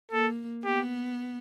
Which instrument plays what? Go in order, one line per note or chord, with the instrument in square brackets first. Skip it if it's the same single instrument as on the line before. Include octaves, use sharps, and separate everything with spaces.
[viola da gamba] A#3 [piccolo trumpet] A4
[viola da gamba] B3 [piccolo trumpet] G4